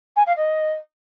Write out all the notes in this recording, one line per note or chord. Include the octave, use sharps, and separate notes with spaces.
G#5
F5
D#5